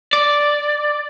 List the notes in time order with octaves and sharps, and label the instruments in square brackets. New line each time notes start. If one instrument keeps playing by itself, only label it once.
[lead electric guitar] D5